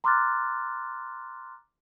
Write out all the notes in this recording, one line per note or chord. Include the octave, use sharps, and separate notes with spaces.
A#5 C6 D6 F6 F#6 A6